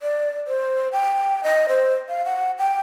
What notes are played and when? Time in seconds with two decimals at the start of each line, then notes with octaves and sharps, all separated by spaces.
0.02 D5
0.47 C5
0.92 G5
1.44 D#5
1.69 C5
2.09 F5
2.25 F#5
2.58 G5